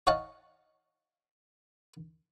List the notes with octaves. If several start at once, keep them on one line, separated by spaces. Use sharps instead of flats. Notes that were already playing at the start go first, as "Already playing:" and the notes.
C#5 D#5 F5 F#5 A5